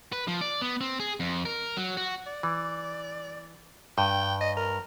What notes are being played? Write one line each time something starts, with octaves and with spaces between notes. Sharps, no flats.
B4
F3
D5
B3
C4
G#4
F2
A#4
F#3
F#4
D5
E3
G2 G5
D#5
A#4